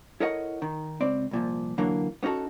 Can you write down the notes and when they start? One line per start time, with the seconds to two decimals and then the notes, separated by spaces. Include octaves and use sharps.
0.20 E4 A4 A#4 C#5 D#5 F#5
0.62 D#3
1.01 C#2 C4 D5
1.31 C2 A#2 F3
1.78 D3 E3 F#3 A#3
2.23 B3 C#4 D#4 F#4 A4